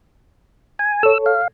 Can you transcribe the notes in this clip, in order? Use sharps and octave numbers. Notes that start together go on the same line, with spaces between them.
G#5
A4 C#5 E6
F5